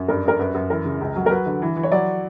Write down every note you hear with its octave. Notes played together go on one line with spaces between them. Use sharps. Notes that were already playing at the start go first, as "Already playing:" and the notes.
Already playing: F#2
G2 A#4
G2 A#4
F#2 B4
F#2
E3 A#4
C#3
C#2
F#3
A#4
F#3 B4
D3
E3
E3
C#5
F#3 D5